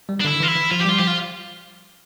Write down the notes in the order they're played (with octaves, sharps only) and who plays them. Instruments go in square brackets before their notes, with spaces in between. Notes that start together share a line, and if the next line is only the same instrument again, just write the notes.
[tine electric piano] G3
[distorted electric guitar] D4
[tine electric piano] D3 [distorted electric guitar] E4
[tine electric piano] D3
[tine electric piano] E3 [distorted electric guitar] F4
[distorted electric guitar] E4
[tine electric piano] E3
[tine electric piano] F3 [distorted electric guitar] F4
[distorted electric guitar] G4
[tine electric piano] G3 [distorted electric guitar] F4
[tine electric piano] F3 [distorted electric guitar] G4
[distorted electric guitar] F4